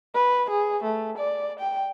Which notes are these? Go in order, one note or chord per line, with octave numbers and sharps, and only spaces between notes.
B4
G#4
A3
D5
G5